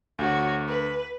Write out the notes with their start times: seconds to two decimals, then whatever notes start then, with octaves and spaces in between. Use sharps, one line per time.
0.19 D2 F#4 C#5
0.68 B4